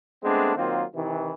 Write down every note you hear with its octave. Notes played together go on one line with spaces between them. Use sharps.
G#3 A3 B3 C4 D4
D#3 F#3 A#3 C4 F4
C3 D#3 E3